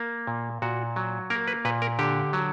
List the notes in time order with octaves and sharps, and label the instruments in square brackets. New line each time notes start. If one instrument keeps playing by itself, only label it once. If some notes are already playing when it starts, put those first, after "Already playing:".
Already playing: [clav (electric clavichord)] A#3
A#2
A#2 F#4
F#3
A#3 A#4
B4
A#2 B4
A#4
D3 G4
F#3